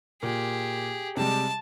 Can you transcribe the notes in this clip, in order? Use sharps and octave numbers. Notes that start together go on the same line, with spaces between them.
A#2 G4 G#4
C3 G3 G#3 A5